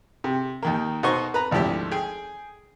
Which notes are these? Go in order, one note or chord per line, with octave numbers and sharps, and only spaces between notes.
C3
D#2 D#3 A#3
B2 D#4 F#4 C5 D#5 C#6
B4 A#5
G#1 D2 F3 E4 G4
G#4 G5